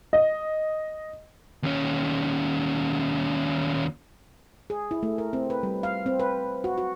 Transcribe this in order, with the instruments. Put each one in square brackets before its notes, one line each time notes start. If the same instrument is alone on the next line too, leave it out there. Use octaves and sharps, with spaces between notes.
[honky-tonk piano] D#5
[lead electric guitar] D#2 C#4
[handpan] G#4
E4
A3
A#4
C4
B4
G3
F5
C4
B4
F#4
F#4